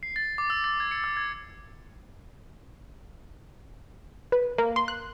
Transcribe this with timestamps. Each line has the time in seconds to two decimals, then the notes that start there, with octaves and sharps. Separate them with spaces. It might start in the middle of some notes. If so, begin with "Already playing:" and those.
0.03 C7
0.16 A6
0.38 D6
0.50 E6
0.64 A6
0.80 G#6
0.91 C#7
1.04 E6
1.17 G#6
4.32 B4
4.58 A#3
4.76 C6
4.88 F#6